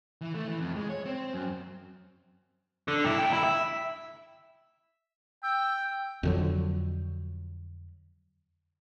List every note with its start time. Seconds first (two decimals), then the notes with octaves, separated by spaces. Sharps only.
0.21 E3
0.34 A3
0.48 E3
0.61 F2
0.76 G#3
0.90 C#5
1.05 C4
1.34 F#2
2.88 D3
3.04 G2 E4
3.18 D2 G5
3.33 E4
3.44 E5
5.43 G5 E6
6.23 F2 D3 F#3